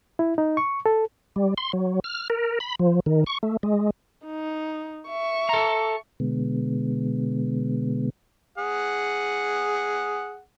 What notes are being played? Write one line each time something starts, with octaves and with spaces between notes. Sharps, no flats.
E4
D#4
C#6
A4
G3
C6
F#3
F6
A#4
B5
F3
D#3
C#6
A3
G#3
D#4
E5 C#6
A4 A#5
B2 D3 G#3 B3
G#4 F#5